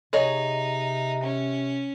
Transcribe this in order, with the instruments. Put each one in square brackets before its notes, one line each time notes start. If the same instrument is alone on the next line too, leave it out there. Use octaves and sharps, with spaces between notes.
[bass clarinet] C3 [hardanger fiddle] D#4 [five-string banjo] G#4 C#5 D#5
[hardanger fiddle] C#4